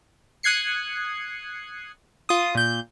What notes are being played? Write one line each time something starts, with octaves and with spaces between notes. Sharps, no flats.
D#6 F#6 G#6 C7 C#7
F4 D#6
A#2 G6